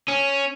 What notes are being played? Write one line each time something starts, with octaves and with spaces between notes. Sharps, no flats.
C#4